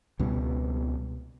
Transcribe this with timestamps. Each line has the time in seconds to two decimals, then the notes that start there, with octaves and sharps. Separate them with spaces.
0.19 C#2 B2 G3